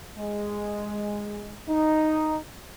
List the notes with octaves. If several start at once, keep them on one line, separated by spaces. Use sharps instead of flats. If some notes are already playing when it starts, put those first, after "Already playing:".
G#3
D#4